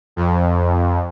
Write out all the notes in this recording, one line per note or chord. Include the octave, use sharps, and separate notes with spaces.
F2